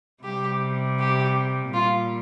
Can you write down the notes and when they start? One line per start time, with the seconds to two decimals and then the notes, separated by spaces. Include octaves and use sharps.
0.22 C3 G3 G4
0.97 G4
1.72 A#2 G3 F4